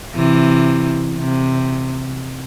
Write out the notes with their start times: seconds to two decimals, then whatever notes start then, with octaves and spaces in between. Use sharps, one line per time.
0.15 C3 E3
1.17 C3